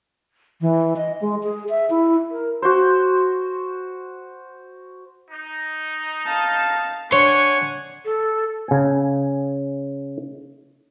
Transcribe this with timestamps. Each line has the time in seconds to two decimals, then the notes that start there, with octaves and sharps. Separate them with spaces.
0.61 E3
0.97 D#5
1.21 G#3
1.44 G#4
1.69 E5
1.90 E4
2.31 A#4
2.62 F#4 C5
5.31 D#4
6.26 F5 A5
7.11 D4 C#5 F#5 G#5 C6 C#6
8.05 A4
8.68 C#3 G#5